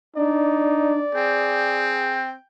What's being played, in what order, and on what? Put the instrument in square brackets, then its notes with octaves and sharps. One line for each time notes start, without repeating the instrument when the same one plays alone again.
[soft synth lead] D4 [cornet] D#4 [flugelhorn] D5
[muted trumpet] C4 [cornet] G#4 [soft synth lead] G5